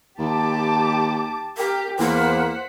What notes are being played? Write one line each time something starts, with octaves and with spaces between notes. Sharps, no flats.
D#2 G4 A5 D6
G4 A#4
E2 A#3 C5 F#5 B6